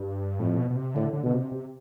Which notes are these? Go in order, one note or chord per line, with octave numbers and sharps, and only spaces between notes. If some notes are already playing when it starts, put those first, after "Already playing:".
Already playing: G2
F2 A2
B2
B2
C3
A2 D3
D3
B2 D3
C3
C3